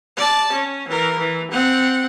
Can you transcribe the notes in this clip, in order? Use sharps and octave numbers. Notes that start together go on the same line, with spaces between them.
D5 A5
C#4
E3 A#4
E3
C4 F#5